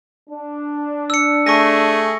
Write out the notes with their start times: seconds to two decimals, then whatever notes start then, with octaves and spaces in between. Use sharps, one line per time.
0.30 D4
1.10 E6 C#7
1.47 A3 G#4 C#6 A#6